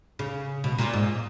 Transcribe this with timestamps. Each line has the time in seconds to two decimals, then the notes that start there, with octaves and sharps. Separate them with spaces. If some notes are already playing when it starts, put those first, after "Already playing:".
0.19 C#3
0.64 B2
0.78 A#2
0.94 G#2